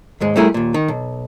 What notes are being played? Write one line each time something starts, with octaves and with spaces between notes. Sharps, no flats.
D#2 G#2 G#3
G3 A3 E4 G#4 A#4
D#2 A#2
D#3
B1